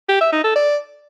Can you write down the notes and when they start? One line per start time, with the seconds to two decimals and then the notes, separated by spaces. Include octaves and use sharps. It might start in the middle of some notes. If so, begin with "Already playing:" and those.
0.09 G4
0.21 E5
0.32 D#4
0.44 A4
0.56 D5